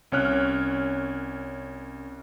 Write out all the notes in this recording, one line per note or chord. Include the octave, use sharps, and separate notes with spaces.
C2 C#4 C#5 F6 F#6